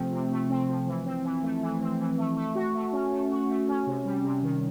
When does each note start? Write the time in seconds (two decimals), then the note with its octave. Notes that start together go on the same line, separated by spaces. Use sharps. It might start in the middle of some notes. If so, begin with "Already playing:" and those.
Already playing: C3 F3 A3 C4
0.12 C3
0.31 A3
0.50 C4
0.68 F3
0.87 E3
1.06 C4
1.25 E3
1.43 A3
1.62 E3
1.81 C4
1.99 E3
2.18 A3
2.37 A3
2.55 F#4
2.74 A3
2.93 C#4
3.12 A3
3.31 F#4
3.49 A3
3.68 C#4
3.87 C3
4.05 G3
4.24 C3
4.43 D#3